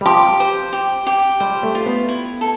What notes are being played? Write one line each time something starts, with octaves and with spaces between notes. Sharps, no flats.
G3
F3 G4
C5
G4
G4
G3 C5
A3
F4
B3
E4
A4